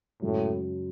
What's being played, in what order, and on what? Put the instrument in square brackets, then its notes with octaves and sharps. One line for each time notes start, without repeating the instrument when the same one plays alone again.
[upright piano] F#2 C#3 G#3 [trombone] A2